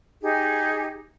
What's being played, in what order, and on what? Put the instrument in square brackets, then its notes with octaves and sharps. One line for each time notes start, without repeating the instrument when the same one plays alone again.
[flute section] D#4 G4 G#4